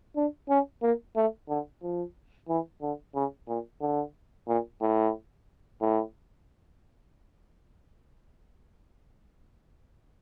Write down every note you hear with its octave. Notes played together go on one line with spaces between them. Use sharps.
D4
C#4
A#3
A3
D3
F3
E3
D3
C#3
A#2
D3
A#2
A2
A2